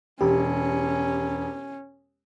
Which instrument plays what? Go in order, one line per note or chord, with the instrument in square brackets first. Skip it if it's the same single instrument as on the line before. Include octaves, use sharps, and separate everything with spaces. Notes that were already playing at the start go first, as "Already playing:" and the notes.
[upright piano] E1 [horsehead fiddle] C#4 [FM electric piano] G4